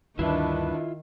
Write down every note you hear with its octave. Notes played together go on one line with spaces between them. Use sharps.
D2 G2 D#3 D4 E4 F4 B4 E5